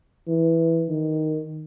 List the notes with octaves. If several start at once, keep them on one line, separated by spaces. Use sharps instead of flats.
E3
D#3